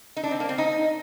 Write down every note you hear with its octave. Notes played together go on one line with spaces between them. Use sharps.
D#4
D4
C4
A#3
C4
D#4